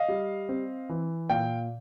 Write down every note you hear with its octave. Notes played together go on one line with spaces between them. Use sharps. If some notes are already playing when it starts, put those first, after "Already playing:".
Already playing: D#5 F5
G3
C4
E3
A#2 F5 G5